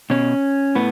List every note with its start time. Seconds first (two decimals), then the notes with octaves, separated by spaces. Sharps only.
0.10 B2 C#4
0.75 A2 B3